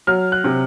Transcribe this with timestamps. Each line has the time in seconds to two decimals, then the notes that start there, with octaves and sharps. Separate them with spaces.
0.07 F#3 F6
0.32 F#6
0.44 C3